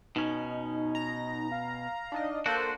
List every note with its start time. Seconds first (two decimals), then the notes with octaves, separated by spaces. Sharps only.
0.16 B2 C#4 D#4
0.95 A#5
1.52 F5
2.12 D4 D#4 D#5
2.46 A#3 D4 F#4 A4 C5 A5